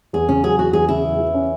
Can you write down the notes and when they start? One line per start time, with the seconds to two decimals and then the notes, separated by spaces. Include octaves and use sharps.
0.13 E2 G#4
0.29 C#3 C#4
0.44 F#3 G#4
0.58 E2 F#4
0.73 E2 G#4
0.89 C#3 E4
1.04 E2
1.19 E3
1.34 C#4